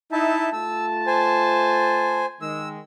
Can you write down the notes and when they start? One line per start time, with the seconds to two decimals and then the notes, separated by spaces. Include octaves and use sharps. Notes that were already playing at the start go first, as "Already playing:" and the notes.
0.12 D#4 E4 E5 A5
0.53 A3 F4 A5 E6
1.07 C5 G#5
2.41 D#3 G#3 E6